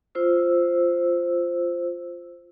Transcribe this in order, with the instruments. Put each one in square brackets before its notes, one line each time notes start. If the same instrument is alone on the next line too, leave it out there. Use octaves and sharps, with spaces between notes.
[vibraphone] F4 C5 E6